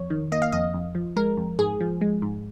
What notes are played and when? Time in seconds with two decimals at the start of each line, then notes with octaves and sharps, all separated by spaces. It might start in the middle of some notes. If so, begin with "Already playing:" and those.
Already playing: F2 C#5
0.10 D#3
0.32 A#3 D#5
0.42 F5
0.52 F2 D#5
0.74 F2
0.95 F3
1.16 G#3 A#4
1.37 F2
1.59 G#2 G#4
1.80 F3
2.01 G#3
2.22 G#2